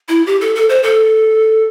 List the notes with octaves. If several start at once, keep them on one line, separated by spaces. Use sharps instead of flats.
E4
G4
A4
A4
C5
A4